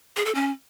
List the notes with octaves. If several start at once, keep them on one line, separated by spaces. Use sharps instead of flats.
G#4
A4
C#4